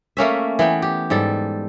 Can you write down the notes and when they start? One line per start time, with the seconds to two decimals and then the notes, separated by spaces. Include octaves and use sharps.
0.17 A3 A#3 C#4 E5
0.59 E3 B3 G5
0.82 G4
1.10 G#2 G3 A4